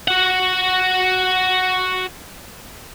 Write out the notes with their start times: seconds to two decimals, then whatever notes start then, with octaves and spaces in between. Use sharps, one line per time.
0.08 F#4 F#5